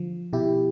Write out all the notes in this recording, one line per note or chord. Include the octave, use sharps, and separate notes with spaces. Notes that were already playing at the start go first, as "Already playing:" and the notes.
Already playing: D3 F3
B2 E4 G4